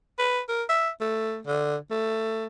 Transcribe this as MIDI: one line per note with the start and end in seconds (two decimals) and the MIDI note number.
0.19 0.41 71
0.49 0.64 70
0.69 0.89 76
1.01 1.40 57
1.47 1.76 50
1.91 2.47 57